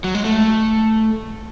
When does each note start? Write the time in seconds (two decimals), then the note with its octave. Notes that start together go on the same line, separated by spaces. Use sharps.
0.04 F#3
0.15 G#3
0.25 A3